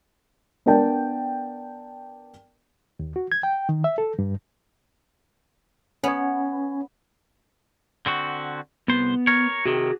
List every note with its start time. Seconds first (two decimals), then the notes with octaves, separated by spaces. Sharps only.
0.66 B3 D4 A#4 G5 A5
2.99 D#2
3.16 F#4
3.32 G#6
3.43 G5
3.69 D#3
3.84 E5
3.98 A4
4.19 G2
6.04 B3 C#4 C#5
8.06 D3 C4 F#4
8.88 C2 B3 C5
9.27 A#4 C#5
9.66 C3 D#3 F#4 G#4